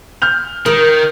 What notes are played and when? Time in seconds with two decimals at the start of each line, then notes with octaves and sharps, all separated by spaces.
0.22 F6 G6 F7
0.66 D#3 A#4